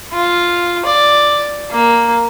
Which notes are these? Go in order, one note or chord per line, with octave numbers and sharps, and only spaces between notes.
F4
D5
A#3